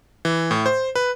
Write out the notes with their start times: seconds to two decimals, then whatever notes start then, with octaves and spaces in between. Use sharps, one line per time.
0.25 E3
0.51 A2
0.66 C5
0.95 B4